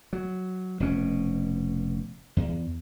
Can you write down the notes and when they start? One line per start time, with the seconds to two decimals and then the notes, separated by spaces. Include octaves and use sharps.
0.13 F#3
0.80 F1 B2 C#4
2.37 E2